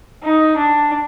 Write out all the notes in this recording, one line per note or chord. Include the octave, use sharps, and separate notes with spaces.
D#4
D4